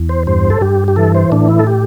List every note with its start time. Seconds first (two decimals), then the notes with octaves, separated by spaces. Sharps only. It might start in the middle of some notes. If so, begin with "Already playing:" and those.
Already playing: E2
0.09 C5
0.27 G2 C5
0.50 A4
0.61 G2 G4
0.88 G4
0.96 E3 A4
1.15 C5
1.32 A2 D4
1.49 E4
1.59 A4
1.67 G4